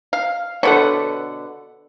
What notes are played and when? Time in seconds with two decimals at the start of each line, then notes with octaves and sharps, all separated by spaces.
0.13 F5
0.63 B2 D3 A4 B4 C#5 F#5